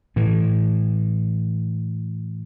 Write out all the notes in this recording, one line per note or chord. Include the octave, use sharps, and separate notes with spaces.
A2 E3